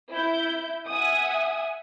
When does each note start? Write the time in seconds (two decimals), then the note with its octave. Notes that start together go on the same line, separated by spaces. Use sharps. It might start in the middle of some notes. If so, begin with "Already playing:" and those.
0.13 E4 G6
0.89 E5 F#5 G#5 D#6